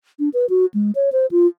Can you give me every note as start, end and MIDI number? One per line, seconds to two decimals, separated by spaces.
0.19 0.29 62
0.34 0.46 71
0.50 0.66 66
0.74 0.91 56
0.95 1.10 73
1.12 1.26 72
1.31 1.47 65